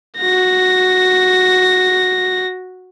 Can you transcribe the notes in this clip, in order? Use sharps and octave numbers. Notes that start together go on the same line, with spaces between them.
F#4 A#6